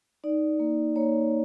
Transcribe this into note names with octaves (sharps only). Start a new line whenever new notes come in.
D#4 D5
A#3
A#3 C#5